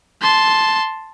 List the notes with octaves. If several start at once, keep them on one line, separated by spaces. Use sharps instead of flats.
A5 C6